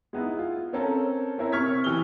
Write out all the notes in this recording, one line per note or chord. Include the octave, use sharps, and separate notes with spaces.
G#3 B3 D#4 E4
F4
C4 C#4 A4 A#4
C4 C#4 E4 A#4
C3 C#6 F6 G#6 B6
E3 G4 F6 G7